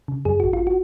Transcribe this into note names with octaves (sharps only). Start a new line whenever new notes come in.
C#3
F#2 G#4
G#1 F#4
F4
F#4